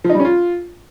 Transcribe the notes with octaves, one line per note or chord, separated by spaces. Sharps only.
F3
D#4
G3
C#4
F4